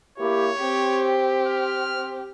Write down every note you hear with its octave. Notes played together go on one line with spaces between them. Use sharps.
A#3 E4 G4 C#5
C4 G4
F6